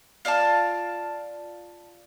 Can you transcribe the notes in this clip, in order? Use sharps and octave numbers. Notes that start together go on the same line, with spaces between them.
F4 D5 F5 A5